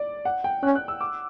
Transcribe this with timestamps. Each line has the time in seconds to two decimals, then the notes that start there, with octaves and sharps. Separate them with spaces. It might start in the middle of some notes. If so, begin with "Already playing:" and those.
Already playing: D5
0.25 F#5
0.44 G5
0.62 C#4 F#6
0.75 F#6
0.88 E6
1.01 D6